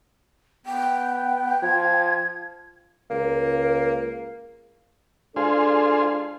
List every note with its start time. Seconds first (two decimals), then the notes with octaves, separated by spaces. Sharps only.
0.66 B3 G5
1.63 F3 G#6
3.11 C#2 A#3
5.36 G#3 D4 F4 G#4 A4 C5